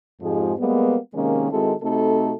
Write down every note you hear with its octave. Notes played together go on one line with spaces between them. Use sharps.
F2 G#2 F3 G#3 G4 G#4
G3 G#3 A#3 B3
C3 D#3 G#3 A#3 C#4
D#3 G#3 C4 E4 F#4 A4
C3 A3 C4 D#4 F#4 A4